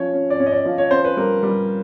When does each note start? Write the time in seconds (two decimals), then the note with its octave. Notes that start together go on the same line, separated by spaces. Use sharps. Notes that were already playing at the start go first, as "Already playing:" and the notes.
Already playing: F3 C#4 C#5
0.13 C#4
0.30 D5
0.39 C#4 C#5
0.46 D#5
0.52 D5
0.65 F3
0.78 C#5
0.91 C#4 C5
1.05 B4
1.17 G3 A#4
1.43 G3